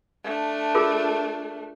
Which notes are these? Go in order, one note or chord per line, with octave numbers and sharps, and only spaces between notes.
A3 D4
F4 G#4 A#4